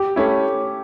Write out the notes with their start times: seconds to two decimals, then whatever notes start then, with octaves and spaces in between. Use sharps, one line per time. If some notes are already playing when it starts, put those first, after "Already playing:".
Already playing: G4
0.16 A3 C#4 E4